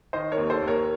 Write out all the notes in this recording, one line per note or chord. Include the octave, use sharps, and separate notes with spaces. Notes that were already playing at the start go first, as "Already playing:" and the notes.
D#3 C5 D#5
A#4 C#5
D#2
A4 C5
D#2
A#4 C#5